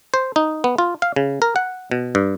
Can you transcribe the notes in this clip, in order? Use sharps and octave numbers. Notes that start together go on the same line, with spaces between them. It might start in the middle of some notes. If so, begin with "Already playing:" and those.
C5
D#4
B3
F4
F5
C#3
A#4
F#5
B2
G2